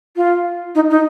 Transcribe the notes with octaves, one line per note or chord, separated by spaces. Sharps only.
F4
D#4
D#4